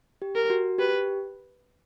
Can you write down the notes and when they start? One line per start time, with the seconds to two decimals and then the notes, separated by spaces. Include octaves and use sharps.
0.22 G4
0.35 A#4
0.50 F#4
0.78 G4 B4